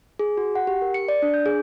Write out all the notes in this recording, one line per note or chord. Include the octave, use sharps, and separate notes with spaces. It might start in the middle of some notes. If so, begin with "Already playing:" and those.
G#4
F#4
F#5
G4
A#4
C#7
D5
D4
G6
G#4